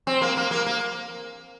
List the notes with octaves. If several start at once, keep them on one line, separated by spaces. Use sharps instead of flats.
C4
A#3
A#3
A#3
A#3